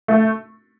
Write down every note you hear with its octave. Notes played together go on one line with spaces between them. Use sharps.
A3